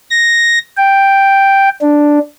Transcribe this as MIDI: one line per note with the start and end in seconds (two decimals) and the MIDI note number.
0.11 0.59 94
0.77 1.69 79
1.81 2.19 62